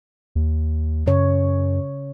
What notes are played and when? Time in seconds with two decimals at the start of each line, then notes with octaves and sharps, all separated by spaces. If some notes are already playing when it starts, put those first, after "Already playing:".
0.35 D#2
1.06 F#2 C#3 C#4 C#5